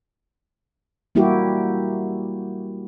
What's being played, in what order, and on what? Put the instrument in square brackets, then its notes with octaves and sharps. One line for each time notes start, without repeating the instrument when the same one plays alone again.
[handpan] G3 A#3 E4 F#4 G4